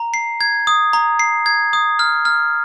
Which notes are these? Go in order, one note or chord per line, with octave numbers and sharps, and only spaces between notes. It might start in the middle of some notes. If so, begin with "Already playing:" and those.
Already playing: A#5
C7
G#6
D#6
A#5
C7
G#6
D#6
F6
F6